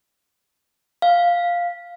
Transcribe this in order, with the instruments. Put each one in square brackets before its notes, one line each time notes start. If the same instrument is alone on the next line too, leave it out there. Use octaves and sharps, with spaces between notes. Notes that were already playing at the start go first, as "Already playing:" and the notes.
[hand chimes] F5